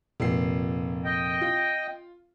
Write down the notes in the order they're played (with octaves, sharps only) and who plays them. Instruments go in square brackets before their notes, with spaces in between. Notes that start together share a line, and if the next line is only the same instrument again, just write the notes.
[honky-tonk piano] F1 A#2 C7
[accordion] D#5 G5
[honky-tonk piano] F4